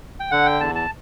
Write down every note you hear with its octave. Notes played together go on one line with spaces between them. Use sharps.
G5
D3 F#5
G5
E2 A5
A5